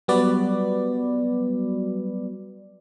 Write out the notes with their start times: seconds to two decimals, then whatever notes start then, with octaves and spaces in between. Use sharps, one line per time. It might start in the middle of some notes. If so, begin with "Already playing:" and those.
0.08 F#3 G3 B3 F#4 B4 D5